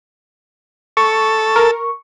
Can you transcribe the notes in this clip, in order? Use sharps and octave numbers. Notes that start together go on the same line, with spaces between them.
A4 C#6
A#4